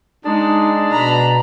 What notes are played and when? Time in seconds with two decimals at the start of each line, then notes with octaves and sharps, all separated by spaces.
0.25 G#3 D4 D#4
0.92 B2 A#5 B5